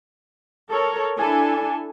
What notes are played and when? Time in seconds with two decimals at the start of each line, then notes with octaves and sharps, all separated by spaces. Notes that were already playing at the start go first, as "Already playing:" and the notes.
0.71 A4 A#4 C#5
1.17 D4 E4 A4 G#5